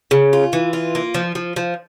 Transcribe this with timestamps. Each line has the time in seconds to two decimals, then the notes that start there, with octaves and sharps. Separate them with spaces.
0.11 C#3
0.33 F4
0.53 E3
0.73 F4
0.95 A#3
1.14 F3
1.35 F3
1.56 F3